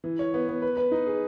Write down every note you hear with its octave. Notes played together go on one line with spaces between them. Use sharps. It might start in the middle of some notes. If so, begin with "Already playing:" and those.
E3
C#5
B3
B3
B4
B4
D#4
G#4